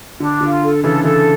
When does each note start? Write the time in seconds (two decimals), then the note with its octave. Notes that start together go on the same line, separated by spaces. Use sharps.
0.20 D3 D4
0.41 D3 F4
0.62 A4
0.83 C#3 E3 A4
1.04 C#3 E3 A4